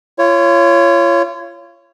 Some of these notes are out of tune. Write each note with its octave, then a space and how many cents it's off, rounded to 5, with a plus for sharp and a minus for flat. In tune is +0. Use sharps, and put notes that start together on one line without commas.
F4 -35 C#5 +0